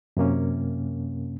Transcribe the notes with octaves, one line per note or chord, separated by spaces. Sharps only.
F#2 C3 A#3 C#4